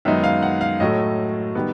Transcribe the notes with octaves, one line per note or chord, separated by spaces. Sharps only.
F#2 D#3 G#3 B3 D#4 E5
F5
F#5
F5
A2 F#3 A3 D#5
D#3 G3 B3